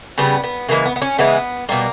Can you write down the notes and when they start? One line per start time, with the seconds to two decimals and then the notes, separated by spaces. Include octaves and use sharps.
0.18 C#3 G3 B3
0.44 B3
0.68 C#3 E3 G#3 A#3
0.85 B3
0.96 B3
1.02 C#4
1.18 C#3 E3 G#3 B3
1.69 B2 G3 A#3